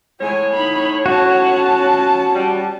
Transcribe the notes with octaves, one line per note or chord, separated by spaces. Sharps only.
A2 G#3 C#5 G#5
D#4 B5
C#4 F#4 A5
G3